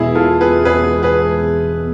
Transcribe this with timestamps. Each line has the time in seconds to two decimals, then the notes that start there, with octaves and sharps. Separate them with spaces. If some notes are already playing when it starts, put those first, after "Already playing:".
Already playing: E2 B2 G#3 B3 E4 G#4
0.15 F4 A4
0.41 G#4 B4
0.65 E2 B2 G#3 B3 G#4 B4
1.03 G#4 B4